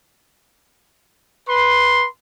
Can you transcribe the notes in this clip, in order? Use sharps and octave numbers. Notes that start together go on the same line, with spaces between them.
B4 C6